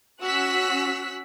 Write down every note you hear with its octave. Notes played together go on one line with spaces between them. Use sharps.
C#4 F#4 E6 F#6 B6